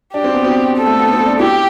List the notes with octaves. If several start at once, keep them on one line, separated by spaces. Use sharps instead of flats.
D4 G4
C4
B3
C4
A4
A3
B3
C4
D4
E4 G4